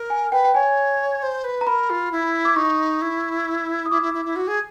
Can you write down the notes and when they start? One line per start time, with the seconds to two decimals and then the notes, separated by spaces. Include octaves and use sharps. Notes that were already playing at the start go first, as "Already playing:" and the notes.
Already playing: A#4
0.10 G#5
0.32 B4 G5
0.45 G5
0.55 C#5 G#5
1.23 C5
1.44 B4
1.61 A#5
1.67 A#4 B5
1.90 F4
2.12 E4
2.45 D6
2.56 D#4 C#6
3.01 E4
3.86 D#6
3.91 E4 D6
4.02 E4
4.14 E4
4.25 E4
4.36 F#4
4.47 G#4